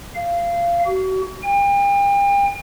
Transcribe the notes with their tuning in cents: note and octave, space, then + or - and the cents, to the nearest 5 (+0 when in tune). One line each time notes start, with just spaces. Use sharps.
F5 -20
F#4 +35
G5 +40